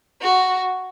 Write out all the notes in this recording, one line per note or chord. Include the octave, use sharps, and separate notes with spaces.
F#4